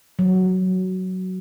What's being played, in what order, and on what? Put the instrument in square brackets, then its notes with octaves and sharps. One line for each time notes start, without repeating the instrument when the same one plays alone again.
[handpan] F#3